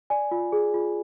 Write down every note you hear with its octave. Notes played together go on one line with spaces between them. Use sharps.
D5 G#5
F4
G#4
F4